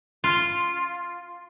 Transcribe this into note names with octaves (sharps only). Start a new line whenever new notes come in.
F4